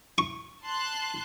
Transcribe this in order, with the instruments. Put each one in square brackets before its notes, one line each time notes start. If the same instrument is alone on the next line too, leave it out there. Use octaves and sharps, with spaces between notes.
[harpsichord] C#6
[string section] A5 C6 F#6